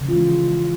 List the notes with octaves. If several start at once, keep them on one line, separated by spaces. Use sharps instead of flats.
C#3 E3 F3 G#3 F4